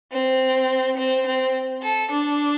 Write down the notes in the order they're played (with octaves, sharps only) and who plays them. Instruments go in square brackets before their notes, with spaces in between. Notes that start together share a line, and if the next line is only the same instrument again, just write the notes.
[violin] C4
C4
C4
A4
D4